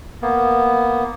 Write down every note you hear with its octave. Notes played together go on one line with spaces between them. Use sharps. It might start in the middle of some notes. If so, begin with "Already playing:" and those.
A#3 B3